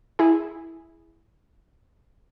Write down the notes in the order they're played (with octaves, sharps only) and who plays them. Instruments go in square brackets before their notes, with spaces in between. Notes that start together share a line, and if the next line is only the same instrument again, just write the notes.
[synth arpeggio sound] E4 G#4